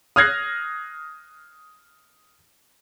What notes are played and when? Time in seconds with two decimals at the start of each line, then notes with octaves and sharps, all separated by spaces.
0.16 D#6 F6 F#6 G#6 A#6 C7